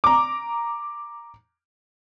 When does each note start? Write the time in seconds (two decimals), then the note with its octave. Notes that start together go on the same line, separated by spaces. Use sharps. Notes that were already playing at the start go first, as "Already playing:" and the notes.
0.04 A#5 D6